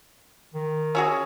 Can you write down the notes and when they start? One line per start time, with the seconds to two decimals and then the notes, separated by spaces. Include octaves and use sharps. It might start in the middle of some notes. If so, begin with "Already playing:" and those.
0.54 D#3
0.95 C#4 F#4 G#4